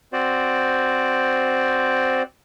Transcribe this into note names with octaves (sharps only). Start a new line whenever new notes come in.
C4 F#4 C5 D5